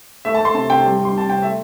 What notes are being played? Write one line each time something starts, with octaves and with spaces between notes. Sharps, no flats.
A3 E5
A5
A3 C6
C3 A5
C3 G5
G3
G3
C6
C3
A5
C3 G5
A3 E5